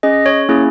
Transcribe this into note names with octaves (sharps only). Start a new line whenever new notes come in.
C#4 G#4 D#5
C#5
A#3 C#4 E4 G#4